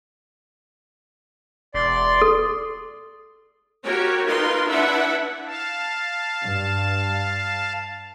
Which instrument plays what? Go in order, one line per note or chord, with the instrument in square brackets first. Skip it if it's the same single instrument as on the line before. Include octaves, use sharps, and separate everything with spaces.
[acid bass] E1 [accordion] D5 C6
[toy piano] A4
[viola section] F#4 G4 A#4 C#5
D#4 F4 A#4 B4 C6
D4 E4 B4 E5 F#5
[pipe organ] F5 A5
[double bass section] G2